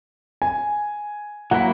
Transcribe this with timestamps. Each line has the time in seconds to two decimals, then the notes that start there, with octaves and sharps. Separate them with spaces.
0.42 G#5
1.51 F#3 A#3 E4 F#5